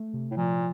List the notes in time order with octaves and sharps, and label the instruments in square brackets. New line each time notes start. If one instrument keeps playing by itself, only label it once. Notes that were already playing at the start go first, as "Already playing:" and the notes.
Already playing: [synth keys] A3
C3
[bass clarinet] A2
[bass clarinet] A#2 [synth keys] F3